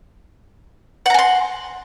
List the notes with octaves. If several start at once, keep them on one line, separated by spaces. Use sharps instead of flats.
F#5 G#5 A#5 C6